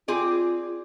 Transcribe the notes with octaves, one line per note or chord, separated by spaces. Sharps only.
C4 F4 G#4 D5